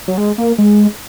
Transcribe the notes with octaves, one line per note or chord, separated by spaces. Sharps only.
F#3
G#3
A#3
G#3